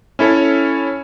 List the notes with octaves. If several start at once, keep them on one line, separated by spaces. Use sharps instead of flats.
C#4 E4 A4 C#5